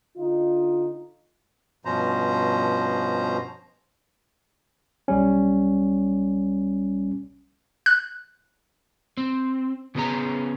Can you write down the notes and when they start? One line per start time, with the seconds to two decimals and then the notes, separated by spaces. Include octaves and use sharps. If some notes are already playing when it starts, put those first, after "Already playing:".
0.16 D3 D#4 F4
1.85 G2 B2 F3 C#4 C5 A#5
5.08 B1 G3 C#4
7.86 F#6
9.17 C4
9.95 C#3 B3 C#4 G#4 A#5